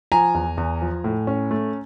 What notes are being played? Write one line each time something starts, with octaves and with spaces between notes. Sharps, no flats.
F3 G#5 A#5
E2
E2
F3
A2
C#4
A3